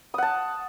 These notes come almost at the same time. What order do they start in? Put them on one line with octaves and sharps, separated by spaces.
D#6 F#5 A5